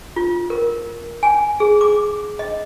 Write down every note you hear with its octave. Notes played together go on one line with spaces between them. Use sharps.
F4
A#4
G#5
G#4
D6
D#5